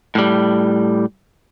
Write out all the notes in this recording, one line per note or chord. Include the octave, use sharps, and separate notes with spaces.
A2 G3